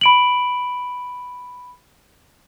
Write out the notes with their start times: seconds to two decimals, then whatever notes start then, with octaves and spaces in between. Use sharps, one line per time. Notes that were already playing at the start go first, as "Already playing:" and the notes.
0.01 B5 D7 F#7